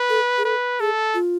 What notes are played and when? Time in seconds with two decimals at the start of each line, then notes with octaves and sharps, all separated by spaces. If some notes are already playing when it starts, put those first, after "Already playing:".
Already playing: B4
0.09 A4
0.38 G#4
0.44 A4 B4
0.80 G#4 A4
1.14 F4